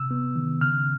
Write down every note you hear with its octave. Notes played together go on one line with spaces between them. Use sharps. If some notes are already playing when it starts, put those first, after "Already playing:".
Already playing: C3 E6
B3
D#3
C#3 F6